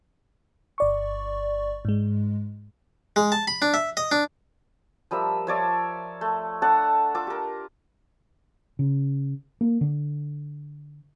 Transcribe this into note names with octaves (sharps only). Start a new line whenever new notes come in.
G1 D5 C#6
G#2 G#3
G#3
A5
B5
D4
E5
D#5
D4
F3 G3 A#4 E5
F3 C#5 D5 E5
A3
D4 A4 F#5 A5
F4 A4 D6
G4 A#4
C#3
A#3
D3